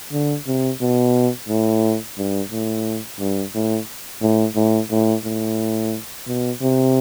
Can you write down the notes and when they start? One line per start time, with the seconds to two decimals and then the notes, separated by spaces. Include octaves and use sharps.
0.12 D3
0.47 C3
0.81 B2
1.49 A2
2.18 G2
2.51 A2
3.20 G2
3.54 A2
4.22 A2
4.56 A2
4.91 A2
5.24 A2
6.27 B2
6.61 C3